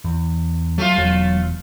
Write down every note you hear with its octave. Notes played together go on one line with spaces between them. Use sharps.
E2
F#3 A3 F4
E1 E2 F#3